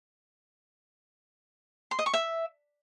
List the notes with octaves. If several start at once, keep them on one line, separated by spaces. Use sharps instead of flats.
C6
D#5
C#6
E5